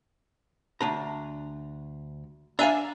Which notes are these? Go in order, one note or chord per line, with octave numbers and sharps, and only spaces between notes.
D2 D4 A#5
D4 E5 F5 G#5 A#5